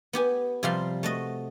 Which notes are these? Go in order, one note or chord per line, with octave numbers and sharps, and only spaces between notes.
B3 G4 G#5
C3 F3 G3 F5 C6
A3 F#4 D#5